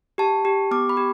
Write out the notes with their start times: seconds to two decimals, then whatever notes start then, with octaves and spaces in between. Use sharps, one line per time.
0.18 G4 A5
0.45 G4
0.71 B3 D6
0.89 B5
0.97 G4